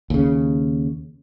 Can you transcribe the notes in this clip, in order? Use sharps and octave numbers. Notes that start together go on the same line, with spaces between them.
D#2 C#3